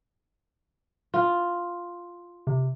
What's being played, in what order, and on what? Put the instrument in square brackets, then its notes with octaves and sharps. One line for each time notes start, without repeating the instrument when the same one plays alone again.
[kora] F4
[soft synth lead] C3